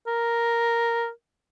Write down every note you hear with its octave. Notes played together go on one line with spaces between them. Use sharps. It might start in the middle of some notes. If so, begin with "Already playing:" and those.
A#4